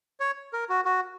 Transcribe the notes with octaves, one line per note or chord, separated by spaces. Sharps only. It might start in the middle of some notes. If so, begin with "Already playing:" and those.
C#5
A#4
F#4
F#4